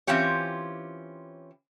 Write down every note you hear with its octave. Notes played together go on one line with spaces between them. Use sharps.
E3 C4 C#4 F4 G4 C#5